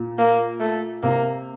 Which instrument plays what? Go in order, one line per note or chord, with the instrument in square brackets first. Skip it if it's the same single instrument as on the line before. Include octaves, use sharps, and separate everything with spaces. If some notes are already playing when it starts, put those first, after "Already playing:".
Already playing: [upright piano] A#2
[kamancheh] A#3
A3
[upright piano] C3 [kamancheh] A#3